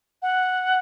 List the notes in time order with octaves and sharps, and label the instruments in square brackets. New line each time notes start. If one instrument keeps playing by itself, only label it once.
[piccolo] F#5